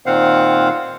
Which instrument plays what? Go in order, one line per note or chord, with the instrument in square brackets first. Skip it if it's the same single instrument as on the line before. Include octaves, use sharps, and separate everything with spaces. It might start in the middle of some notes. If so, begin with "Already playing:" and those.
[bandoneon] A#2 D#3 C4 C5 F5 F#5